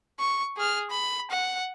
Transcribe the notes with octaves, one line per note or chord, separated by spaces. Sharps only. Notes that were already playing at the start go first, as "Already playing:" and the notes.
C#6
G#4 F6
B5
F#5